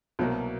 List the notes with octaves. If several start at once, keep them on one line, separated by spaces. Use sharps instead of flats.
C2 B2 F#3 A#3